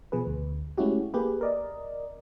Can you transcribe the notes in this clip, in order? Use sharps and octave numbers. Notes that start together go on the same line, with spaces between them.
B2 F3 G#4 B4
D2
G#3 A3 C#4 E4 F#4 G4
A#3 G4 G#4 B4
A#4 D5 D#5